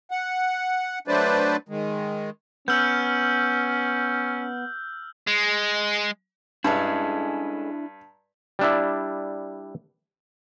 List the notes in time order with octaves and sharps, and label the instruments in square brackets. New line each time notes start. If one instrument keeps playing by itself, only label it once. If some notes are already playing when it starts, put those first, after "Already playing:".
[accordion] F#5
F#3 A3 D4 B4 C5 D5
D#3 G#3
[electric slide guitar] B3 [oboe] C#4 [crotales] E6 F6 G6
[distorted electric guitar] G#3
[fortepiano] G2 [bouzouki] G#3 C#4 A4 [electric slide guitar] D4 E4 [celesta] A5 A#5
[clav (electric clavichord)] G3 D4 E4